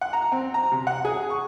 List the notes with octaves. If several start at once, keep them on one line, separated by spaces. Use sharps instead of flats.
F#5
A#5
C4
A#5
C3
F#5
G#4
C#6